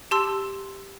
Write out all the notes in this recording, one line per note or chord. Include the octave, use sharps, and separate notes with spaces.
G4 A5 C6 E6